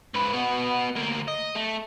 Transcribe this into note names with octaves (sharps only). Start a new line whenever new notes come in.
G#2 B4
B3 F#4
D2 A#3
D#5
A3